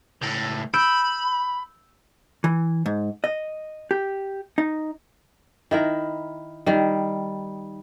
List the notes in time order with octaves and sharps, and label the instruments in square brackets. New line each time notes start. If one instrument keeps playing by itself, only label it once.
[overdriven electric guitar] C#2 A2
[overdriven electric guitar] B5 [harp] E6 G6 D7
[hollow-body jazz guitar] E3
G#2
D#5
G4
D#4
[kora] D#3 E4 A#4
D#3 G3